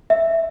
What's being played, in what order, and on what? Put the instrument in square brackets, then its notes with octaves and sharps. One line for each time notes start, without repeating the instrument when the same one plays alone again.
[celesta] E5